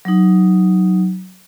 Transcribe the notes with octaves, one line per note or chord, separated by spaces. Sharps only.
F#3 D#4